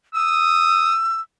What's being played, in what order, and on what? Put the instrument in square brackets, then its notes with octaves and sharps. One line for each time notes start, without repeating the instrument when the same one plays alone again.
[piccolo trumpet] D#6 [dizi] E6